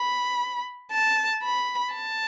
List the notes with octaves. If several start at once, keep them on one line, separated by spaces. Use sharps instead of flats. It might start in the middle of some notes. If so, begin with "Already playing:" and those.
Already playing: B5
A5
B5
A5